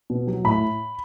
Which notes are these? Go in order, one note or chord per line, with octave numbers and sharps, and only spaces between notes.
B2
F#3
A2 B5